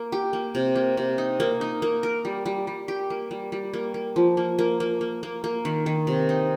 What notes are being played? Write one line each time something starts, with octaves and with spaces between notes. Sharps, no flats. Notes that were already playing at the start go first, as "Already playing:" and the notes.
Already playing: A#3
G4
A#3
C3
A#3
C3
D#4
A#3
D#4
A#3
A#4
G3
G3
G3
G4
A#3
G3
G3
A#3
A#3
F3
A#3
A#3
A#3
A#3
A#3
A#3
D#3
D#3
C3
D#4